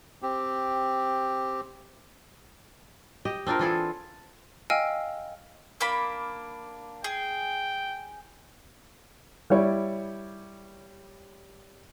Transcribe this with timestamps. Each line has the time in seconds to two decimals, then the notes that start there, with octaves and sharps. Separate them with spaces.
0.22 C4 G4
3.25 G4 D#5
3.47 C4 D4 F4 A#4
3.59 E3 F4 G#4 A4
4.70 D#5 F5 G5 G#5 E6 F6
5.81 A#3 D4 B5
7.04 G#4 G5
9.50 G3 E4 C#5 D5